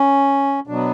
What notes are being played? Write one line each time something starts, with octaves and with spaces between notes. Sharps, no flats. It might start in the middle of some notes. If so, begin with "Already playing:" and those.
Already playing: C#4
B2 F#3 B3 D4